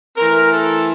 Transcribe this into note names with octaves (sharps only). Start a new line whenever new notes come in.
E3 A3 C4 A#4
A4